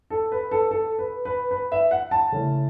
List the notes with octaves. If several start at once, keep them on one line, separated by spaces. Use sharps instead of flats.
A4
B4
A4
A4
B4
B4
B4
E5
F#5
A5
C#3 A3 C#4 E4